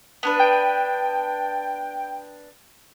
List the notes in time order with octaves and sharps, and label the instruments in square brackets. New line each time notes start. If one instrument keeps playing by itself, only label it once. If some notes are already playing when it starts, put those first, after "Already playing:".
[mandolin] B3 D4 B4
[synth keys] G5